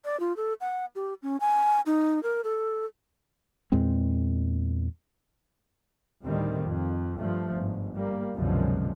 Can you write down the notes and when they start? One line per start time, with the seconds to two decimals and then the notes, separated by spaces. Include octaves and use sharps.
0.05 D5
0.20 F4
0.37 A4
0.61 F#5
0.95 G4
1.23 C#4
1.40 G#5
1.86 D#4
2.23 A#4
2.44 A4
3.72 E2 A#2 G#3 C4
6.24 D2 A2 D#3 G3 C4
6.66 F2
7.18 G2 F3 A3
7.52 G1 G#2
7.97 G3 A#3
8.36 C2 F#2 B2 D3 F3 G#3